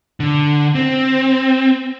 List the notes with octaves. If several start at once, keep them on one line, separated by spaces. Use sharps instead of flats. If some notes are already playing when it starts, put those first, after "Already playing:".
D3
C4